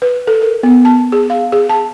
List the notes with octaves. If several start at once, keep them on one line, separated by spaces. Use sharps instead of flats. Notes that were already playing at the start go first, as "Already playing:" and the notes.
B4
A4
A#4
B3
A5
G#4
F5
G#4
A5